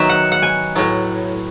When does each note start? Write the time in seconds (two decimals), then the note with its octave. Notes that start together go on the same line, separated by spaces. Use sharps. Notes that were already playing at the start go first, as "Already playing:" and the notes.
Already playing: D#3 F#3 B3 E5
0.09 F#5
0.32 F#5
0.42 G#5
0.75 A2 F#3 B3